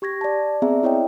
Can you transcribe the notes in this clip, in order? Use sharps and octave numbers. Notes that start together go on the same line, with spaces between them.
G4 C#6 G#6 A#6
D5 A5
B3 C4 G#4 D5 E5 A#5
E4 C#5 D#5 G5